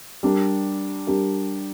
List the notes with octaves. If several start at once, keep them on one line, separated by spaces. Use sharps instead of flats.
G3 D4 G4 A#4
G3 D4 G4 A#4